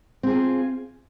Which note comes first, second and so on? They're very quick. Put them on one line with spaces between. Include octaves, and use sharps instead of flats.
C4 G#4 F4